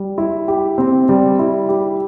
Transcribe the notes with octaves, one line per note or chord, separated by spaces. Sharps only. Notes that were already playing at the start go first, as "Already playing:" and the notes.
Already playing: G3
E4
G4
C4
G3
E4
G4